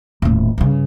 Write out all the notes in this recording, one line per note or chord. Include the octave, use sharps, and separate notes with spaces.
D#1 A2
G2 C#3